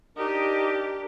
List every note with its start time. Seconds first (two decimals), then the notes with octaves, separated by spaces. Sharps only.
0.17 D4 D#4 G4 A#4